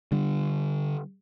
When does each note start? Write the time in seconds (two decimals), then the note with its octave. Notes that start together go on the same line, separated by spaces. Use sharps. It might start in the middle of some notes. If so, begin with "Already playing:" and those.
0.12 D3 G3